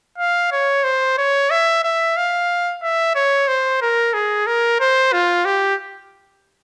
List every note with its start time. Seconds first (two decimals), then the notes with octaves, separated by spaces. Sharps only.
0.18 F5
0.52 C#5
0.84 C5
1.18 C#5
1.50 E5
1.84 E5
2.17 F5
2.82 E5
3.15 C#5
3.48 C5
3.81 A#4
4.14 G#4
4.47 A#4
4.80 C5
5.12 F4
5.45 G4